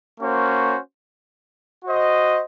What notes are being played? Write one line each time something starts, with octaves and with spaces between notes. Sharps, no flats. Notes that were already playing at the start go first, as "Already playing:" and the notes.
A#3 C#4 F#4 C5
F#4 C5 D#5